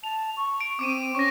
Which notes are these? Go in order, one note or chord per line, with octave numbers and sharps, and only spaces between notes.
A5 F7
C#6
D7
C4 D6 D7 D#7
C#4 C#6 A#6